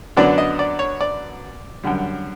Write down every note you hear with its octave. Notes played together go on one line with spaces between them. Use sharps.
F#2 D3 F#3 B3 D4 D5
D#5
D5
C#5
D5
F#2 D3 G3